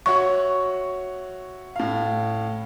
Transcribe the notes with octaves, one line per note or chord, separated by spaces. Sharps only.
F#4 C#5 E5 C#6
A2 F5